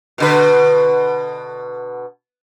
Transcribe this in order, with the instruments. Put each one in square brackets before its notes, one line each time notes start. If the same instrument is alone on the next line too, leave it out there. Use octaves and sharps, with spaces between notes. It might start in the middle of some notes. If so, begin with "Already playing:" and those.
[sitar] B2 D3 B4